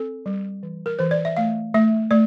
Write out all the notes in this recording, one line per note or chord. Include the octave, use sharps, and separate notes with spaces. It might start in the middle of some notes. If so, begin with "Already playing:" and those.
Already playing: C4 A4
G3
E3
A#4
E3 C5
D5
E5
A3 F5
A3 E5
A3 D5